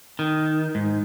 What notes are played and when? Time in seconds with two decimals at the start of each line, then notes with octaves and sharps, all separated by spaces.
0.19 D#3
0.75 G#2